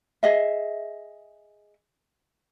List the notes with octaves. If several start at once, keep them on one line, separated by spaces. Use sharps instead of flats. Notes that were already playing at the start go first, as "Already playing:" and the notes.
G#4 D#5 E5